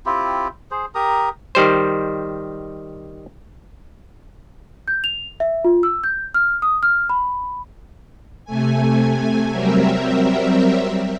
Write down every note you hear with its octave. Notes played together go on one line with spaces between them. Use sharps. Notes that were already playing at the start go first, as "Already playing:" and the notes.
C4 E4 F4 G4
G#4 C5
G4 A#4 A#5 D#6
D#3 G3 C5
G6
F7
E5
F4
E6
G6
F6
D#6
F6
B5
C3 A3 G#5
F#3 G3 C4 A#4 E5